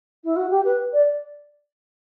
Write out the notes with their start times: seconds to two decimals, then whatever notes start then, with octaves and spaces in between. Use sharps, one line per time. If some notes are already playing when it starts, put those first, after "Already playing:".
0.24 E4
0.36 F#4
0.50 G4
0.64 B4
0.93 D5